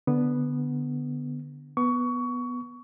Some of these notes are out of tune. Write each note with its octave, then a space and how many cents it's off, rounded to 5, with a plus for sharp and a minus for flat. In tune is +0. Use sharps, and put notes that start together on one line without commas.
D3 +0 B3 +0
B3 +0 C#6 +20